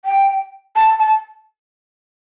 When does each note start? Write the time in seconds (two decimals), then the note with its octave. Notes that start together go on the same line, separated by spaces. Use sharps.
0.05 G5
0.76 A5
0.99 A5